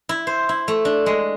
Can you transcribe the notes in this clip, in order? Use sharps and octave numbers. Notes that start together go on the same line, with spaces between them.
E4
C5
E4
A3
D4
G#3